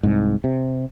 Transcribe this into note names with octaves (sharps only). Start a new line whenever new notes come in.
C2 G#2
C3